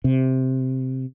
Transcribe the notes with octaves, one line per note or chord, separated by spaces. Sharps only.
C3